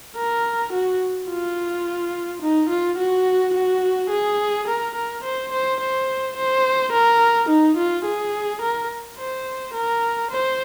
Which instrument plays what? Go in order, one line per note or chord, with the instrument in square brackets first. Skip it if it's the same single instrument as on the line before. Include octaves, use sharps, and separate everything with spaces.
[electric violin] A#4
F#4
F4
D#4
F4
F#4
F#4
G#4
A#4
A#4
C5
C5
C5
C5
A#4
D#4
F4
G#4
A#4
C5
A#4
C5